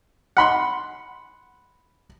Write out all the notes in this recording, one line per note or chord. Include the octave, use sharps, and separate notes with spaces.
F#5 B5 C6